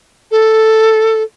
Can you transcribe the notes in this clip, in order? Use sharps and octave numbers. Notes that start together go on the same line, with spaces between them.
A4